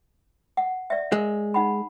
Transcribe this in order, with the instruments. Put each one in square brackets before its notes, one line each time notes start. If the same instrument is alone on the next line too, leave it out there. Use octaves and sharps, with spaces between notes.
[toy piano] F#5
D5 E5
[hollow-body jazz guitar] G#3 [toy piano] A#4
[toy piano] D#4 F#5 B5